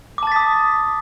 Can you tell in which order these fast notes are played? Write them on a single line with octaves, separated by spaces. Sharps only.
D6 A5 A6 B6 D#6